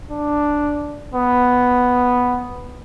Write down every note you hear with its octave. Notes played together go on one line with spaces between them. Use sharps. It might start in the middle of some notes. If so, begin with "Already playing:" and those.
D4
B3